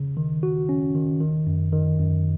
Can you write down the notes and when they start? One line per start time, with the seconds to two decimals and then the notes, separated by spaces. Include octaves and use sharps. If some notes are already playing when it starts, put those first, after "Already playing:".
Already playing: C#3
0.17 D#3
0.43 F#4
0.69 C#4
0.95 D#3
1.21 D#3
1.47 F#2
1.73 D#3
1.99 F#2